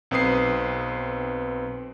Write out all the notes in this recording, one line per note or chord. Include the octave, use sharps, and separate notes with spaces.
B1 C4 B4 D#6 C7